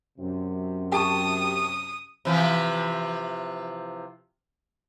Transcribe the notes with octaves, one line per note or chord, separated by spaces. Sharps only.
F#2 C3
G4 A5 C#6 D#6
C3 E3 F3